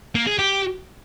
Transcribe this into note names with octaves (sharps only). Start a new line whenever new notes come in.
A#3
G#4
G4